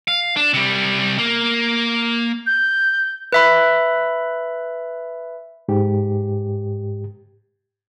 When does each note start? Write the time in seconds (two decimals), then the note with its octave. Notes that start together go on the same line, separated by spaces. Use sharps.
0.08 F5
0.37 D4
0.54 C3 G3
1.18 A#3
2.46 G6
3.33 B4 E5 B5
5.68 G#2 G4